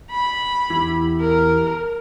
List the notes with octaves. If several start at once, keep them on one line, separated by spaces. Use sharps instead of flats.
B5
E2 E4 G4
A#4